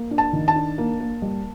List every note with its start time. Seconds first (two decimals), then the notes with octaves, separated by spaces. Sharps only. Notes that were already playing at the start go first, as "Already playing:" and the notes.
Already playing: A#3
0.11 D4
0.18 A5
0.33 D#3
0.48 A5
0.56 D4
0.78 A#3
1.00 A#3
1.22 G3